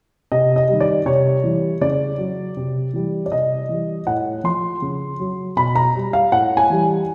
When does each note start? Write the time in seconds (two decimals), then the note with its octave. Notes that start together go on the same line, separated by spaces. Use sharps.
0.32 C3 D#5
0.56 D#5
0.68 G3
0.73 D#3
0.80 D5
1.06 C3 C#5
1.44 E3 G3
1.81 C#3 D5
2.18 F#3
2.57 C3
2.93 E3 G3
3.26 D5
3.32 C3 D#5
3.69 E3 G3
4.07 A2 F#5
4.44 F3 C6
4.82 C#3
5.19 F#3
5.57 B2 B5
5.75 A#5
5.95 G3
6.13 F5
6.32 A2 F#5
6.57 G#5
6.70 E3 G3